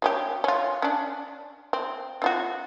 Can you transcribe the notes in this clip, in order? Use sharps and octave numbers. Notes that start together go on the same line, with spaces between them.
F#3 C#4 G4
C#4 F4
C#4 D4
C4
C4 F4 F#4